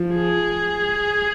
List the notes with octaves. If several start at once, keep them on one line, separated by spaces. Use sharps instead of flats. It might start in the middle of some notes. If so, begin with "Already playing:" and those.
Already playing: F3
G#4